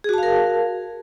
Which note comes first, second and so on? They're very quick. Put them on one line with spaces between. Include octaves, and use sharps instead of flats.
G#4 F#4 A5 F5 A#4